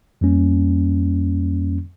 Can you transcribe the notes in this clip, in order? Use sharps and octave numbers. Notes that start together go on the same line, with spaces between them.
F2 G3 A#3 C#4